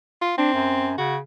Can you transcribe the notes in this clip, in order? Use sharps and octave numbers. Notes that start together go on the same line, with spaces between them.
F4
C4 D4
F#2
C#3 F#4